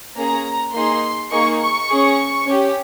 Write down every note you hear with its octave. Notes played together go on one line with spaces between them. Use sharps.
A#3 C#4 G#4 A#5
A#3 D#4 G#4 C6
A#3 D#4 G#4 C#6
C#6
C#4 G#4
C#4 G4